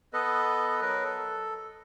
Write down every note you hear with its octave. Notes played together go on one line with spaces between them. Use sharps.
B3 A4 B4 D#5
F#3 A#4 B4
A4